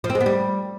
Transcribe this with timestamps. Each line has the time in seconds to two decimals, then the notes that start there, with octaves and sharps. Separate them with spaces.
0.04 F3
0.10 C4
0.15 G#3
0.21 B3
0.26 G3